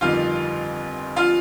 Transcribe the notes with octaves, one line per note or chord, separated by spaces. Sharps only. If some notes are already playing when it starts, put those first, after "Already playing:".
G1 F2 D#3 G3 F4 F5
F4 F5